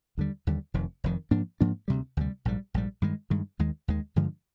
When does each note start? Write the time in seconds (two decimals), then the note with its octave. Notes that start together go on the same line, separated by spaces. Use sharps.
0.18 D#2 D3 G3
0.47 D#2 D3 G3
0.74 F1 F2 D#3
1.04 F1 F2 D#3
1.31 G#2 F3 A#3 D4
1.61 G#2 F3 A#3 D4
1.88 D2 C3 G3
2.17 D2 C3 G3
2.45 A#1 G#2 G3
2.74 A#1 G#2 G3
3.02 G2 D#3 G#3
3.30 G2 D#3 G#3
3.59 D#2 D#3 G#3
3.88 D#2 D#3 G#3
4.16 G2 D3 F3 G#3